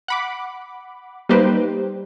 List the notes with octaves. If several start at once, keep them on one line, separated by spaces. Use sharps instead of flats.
F#5 B5 D6
G3 A#3 D#4 G4 B4 C5